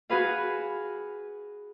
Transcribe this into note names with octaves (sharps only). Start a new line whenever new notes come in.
F#4 G#4 B4 F5